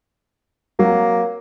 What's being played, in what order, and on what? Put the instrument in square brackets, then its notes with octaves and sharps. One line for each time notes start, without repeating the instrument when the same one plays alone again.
[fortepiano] F#3 [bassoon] A#3